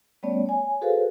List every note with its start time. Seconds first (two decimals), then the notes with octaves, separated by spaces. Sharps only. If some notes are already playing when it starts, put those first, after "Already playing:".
0.23 G3 A3 B3 C#4 C#5 D5
0.46 C#5 G#5
0.81 F#4 G#4 A4 B4 C5 F5